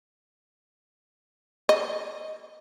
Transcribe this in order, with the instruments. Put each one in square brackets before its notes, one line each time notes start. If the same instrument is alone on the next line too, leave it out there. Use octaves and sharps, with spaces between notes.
[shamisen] D#5